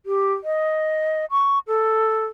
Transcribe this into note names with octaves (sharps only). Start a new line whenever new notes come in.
G4
D#5
C#6
A4